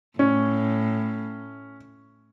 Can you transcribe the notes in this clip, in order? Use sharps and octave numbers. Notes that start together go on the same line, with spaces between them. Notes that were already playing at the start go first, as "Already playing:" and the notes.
A2 C#4